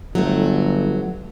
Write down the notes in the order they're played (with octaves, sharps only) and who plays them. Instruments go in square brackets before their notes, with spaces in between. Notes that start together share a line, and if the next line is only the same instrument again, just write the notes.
[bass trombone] G1 [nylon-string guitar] F#3 A3